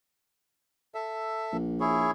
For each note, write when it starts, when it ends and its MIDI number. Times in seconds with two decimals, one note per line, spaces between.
0.95 1.57 69
0.95 1.57 76
1.53 2.11 34
1.80 2.11 64
1.80 2.11 68
1.80 2.11 73